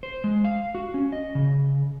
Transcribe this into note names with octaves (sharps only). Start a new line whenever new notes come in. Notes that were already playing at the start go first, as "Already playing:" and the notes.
C5
G#3
F5
F#4
C#4
D#5
C#3